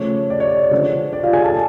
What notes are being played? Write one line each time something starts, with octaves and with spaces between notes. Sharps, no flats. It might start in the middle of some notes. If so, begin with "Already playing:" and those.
Already playing: C#3 F3 A3 C#5
D5
C#5
D5
C#5
D3 F3 G#3 D4
D5
F4 F5
G#4 G#5
A4 A5